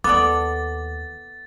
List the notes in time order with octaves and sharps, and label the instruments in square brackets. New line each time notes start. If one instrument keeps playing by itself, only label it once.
[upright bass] D#2 [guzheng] B3 A4 D5 [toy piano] D6 [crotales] A6